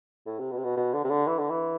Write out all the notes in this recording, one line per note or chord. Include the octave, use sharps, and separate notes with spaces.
A2
C3
B2
C3
B2
B2
D3
C3
D3
E3
D3
E3